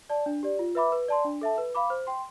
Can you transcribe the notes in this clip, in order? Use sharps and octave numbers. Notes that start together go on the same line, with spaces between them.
D5 A5
D4
G4 D5
F4
B4 E5 B5 D6
B4
D5 A5 C6
D4
A4 E5 A5
B4
F5 B5 D6
C5
G5 C6